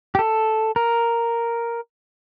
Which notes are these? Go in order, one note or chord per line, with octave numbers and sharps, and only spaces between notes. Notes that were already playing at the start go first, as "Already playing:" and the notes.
G4
A4
A#4